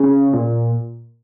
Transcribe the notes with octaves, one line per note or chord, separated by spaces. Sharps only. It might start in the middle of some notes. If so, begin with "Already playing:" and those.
Already playing: C#3
A#2